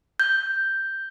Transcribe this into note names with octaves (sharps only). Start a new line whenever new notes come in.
G6